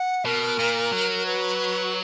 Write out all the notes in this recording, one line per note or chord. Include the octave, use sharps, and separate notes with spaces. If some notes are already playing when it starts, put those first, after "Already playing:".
Already playing: F#5
B2 A#4
A#2
F#3
B4